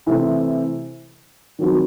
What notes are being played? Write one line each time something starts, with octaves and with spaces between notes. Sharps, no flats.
C3 E3 A3 C4 E4
D#3 F#3 C4 F#4